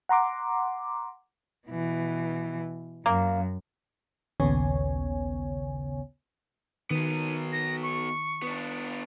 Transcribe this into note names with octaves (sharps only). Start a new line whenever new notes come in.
F#5 A#5 C6 D6
B2 E3
F#2 A#3
A#1 D#2 C#3 B3 C#5 G#5
D#3 F#3 B3 D#7
A#6
C#6
B3 D4